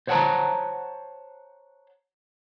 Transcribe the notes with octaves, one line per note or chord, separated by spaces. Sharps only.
C5 C#5 F#5 G5 A5 A#5